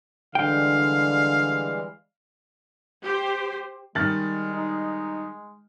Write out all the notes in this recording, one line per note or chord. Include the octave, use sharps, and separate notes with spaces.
D3 E3 G3 G#3 F5 G5
G4 C5
D#3 G3 G#3 F6 A6 F#7
D#4